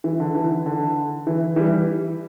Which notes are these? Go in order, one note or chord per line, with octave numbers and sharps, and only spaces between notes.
E3
D3
E3
D3
E3
E3 G3